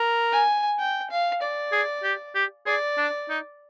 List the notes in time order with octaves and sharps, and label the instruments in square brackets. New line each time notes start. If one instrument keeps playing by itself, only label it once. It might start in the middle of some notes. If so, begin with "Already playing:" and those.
Already playing: [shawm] A#4
[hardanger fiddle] G#5
G5
F5
D5
[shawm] G#4
G4
G4
[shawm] G#4 [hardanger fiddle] D5
[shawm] D4
D#4